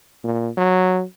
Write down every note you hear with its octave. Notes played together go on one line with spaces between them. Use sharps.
A#2
F#3